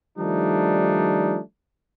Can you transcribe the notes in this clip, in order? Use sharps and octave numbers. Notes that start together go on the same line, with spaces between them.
D#3 F3 G3 A3 D4 D#4